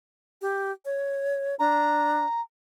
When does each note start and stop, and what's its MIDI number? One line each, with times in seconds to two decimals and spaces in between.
0.42 0.72 67
0.85 1.55 73
1.59 2.25 62
1.59 2.42 82